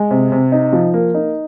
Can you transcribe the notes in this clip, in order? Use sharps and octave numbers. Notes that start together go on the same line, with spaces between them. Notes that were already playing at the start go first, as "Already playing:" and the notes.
Already playing: G#3
C3
C3
D#4
F3
A#3
D#4